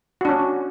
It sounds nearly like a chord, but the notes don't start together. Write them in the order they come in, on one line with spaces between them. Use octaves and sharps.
F#4 D4 C#4